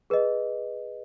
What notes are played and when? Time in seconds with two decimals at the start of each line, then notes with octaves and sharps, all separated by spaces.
0.10 G#4 B4 D#5